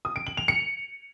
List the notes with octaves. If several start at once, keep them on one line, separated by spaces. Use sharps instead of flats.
D#6
D7
F#7
F7
C#7